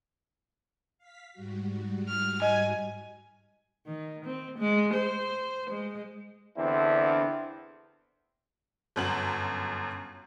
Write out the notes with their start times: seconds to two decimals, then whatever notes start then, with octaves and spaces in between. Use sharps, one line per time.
0.98 F5 B6
1.33 G#2 G3 F#4
2.09 F6
2.42 D#5 G#5
3.86 D#3
4.25 C4
4.59 G#3
4.94 C5
5.70 G#3
6.57 E2 D3 C4 D4 E4
8.96 G1 F#2 F#7